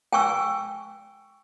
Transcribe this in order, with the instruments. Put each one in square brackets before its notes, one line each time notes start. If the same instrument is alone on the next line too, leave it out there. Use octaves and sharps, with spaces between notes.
[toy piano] G5 G#5 C#6 E6